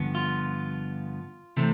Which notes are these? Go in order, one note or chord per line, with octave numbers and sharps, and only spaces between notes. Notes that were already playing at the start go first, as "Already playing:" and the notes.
Already playing: G2 D3 F3 B3
F4
C3 E3 A3 C4